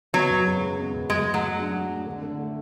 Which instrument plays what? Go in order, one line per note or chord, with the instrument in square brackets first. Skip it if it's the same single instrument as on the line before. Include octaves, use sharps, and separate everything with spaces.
[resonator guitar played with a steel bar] F#3 [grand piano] B3
[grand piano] F#2
C#3
G#3
B3
F#2
[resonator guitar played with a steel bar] G#3 [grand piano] F#4
[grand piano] A2
[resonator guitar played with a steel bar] F#3
[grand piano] G#3
D4
F#4
A2
D3
D3
A3